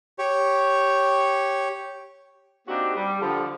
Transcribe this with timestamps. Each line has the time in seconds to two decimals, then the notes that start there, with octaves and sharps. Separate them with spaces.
0.19 G4 C#5
2.68 A#3 C4 D4 D#4 F#4 G4
2.96 G3
3.21 D3 F3